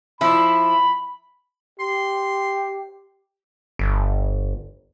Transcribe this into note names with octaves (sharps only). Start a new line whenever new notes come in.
F3 E4 B5
G4 C6
G1